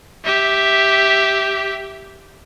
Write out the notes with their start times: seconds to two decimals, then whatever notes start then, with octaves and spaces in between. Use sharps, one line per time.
0.25 G4 E5